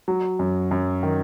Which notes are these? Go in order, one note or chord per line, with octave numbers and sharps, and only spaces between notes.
F#3
F#2
F#2
D#3